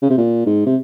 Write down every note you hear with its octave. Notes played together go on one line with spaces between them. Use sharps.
C#3
C3
A#2
G#2
C3